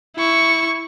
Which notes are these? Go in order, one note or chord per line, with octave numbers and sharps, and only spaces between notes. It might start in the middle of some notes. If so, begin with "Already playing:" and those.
E4 C#6